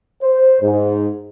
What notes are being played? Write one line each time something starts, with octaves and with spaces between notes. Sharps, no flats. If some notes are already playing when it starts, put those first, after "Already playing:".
C5
G#2